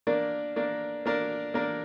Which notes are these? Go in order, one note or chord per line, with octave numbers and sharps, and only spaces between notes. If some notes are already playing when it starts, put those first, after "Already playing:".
A#3 D4 A#4 D5
A#3 D4 A#4 D5
A#3 D4 A#4 D5
A#3 D4 A#4 D5